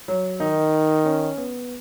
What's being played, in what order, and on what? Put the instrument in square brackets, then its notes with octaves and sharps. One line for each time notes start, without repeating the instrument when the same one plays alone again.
[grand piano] F#3
[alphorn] D#3 [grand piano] D#4
[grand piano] C#4
B3